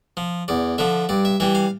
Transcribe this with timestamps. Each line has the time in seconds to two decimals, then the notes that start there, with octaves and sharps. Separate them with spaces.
0.17 F3
0.48 E2 D5
0.78 D3 F3 E5
1.09 G2 D5
1.25 E5
1.40 E3 G3 E5
1.55 F5